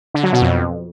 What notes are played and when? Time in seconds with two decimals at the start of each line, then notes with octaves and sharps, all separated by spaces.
0.14 D3
0.23 F#3
0.33 B2
0.42 F2